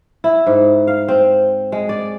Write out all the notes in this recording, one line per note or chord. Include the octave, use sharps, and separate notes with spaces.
E4
G#2
F5
C4
G#3
D5